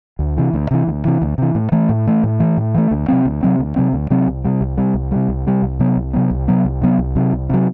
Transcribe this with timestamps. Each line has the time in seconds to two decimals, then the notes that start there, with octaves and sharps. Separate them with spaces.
0.19 D2
0.37 C3 E3
0.54 D2
0.71 C3 E3
0.87 D2
1.05 C3 E3
1.22 D2
1.38 C3 E3
1.55 A2
1.72 E3 A3
1.89 A2
2.07 E3 A3
2.24 A2
2.40 E3 A3
2.57 A2
2.75 E3 A3
2.91 D2
3.08 C3 F#3 C4
3.26 D2
3.43 C3 F#3 C4
3.59 D2
3.76 C3 F#3 C4
3.93 D2
4.10 C3 F#3 C4
4.27 C2
4.44 C3 G3
4.61 C2
4.77 C3 G3
4.94 C2
5.11 C3 G3
5.28 C2
5.46 C3 G3
5.62 C2
5.80 C3 F#3 B3
5.97 C2
6.13 C3 F#3 B3
6.30 C2
6.48 C3 F#3 B3
6.65 C2
6.81 C3 F#3 B3
6.98 C2
7.16 C3 F#3
7.33 C2
7.49 C3 F#3